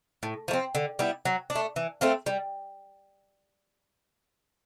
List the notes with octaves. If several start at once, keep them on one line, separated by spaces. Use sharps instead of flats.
A2
F3 A3
C4
D3
G3 B3 E4
F#3
D4
A3
E3
A3 C4 F4
G3